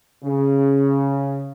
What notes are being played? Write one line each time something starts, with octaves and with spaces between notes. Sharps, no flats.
C#3